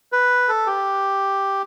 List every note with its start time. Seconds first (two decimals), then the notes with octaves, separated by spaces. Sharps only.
0.12 B4
0.49 A4
0.66 G4